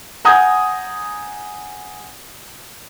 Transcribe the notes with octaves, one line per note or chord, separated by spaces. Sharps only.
F#5 G#5 A#5 D#6 G6 G#6